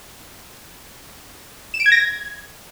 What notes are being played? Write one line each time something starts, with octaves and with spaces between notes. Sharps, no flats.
E7
D7
G#6
A#6
G#6